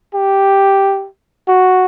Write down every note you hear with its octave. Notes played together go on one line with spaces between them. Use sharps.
G4
F#4